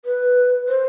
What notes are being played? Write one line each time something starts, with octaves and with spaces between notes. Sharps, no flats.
B4
C5